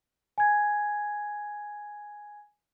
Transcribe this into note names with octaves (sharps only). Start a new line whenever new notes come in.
G#5 G#6